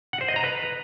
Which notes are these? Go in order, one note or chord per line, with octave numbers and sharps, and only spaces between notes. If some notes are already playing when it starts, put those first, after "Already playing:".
F#5
C5
D#5
A#5
B4